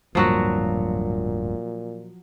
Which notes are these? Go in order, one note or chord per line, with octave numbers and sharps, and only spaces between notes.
D1 G2 A#2 F3 F#3 A#3 F#4